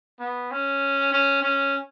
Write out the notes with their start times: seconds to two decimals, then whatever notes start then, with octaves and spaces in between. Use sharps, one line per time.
0.20 B3
0.51 C#4
1.12 C#4
1.43 C#4